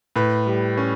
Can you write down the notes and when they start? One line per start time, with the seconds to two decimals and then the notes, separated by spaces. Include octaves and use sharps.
0.16 A2 B4
0.46 G3
0.77 C#4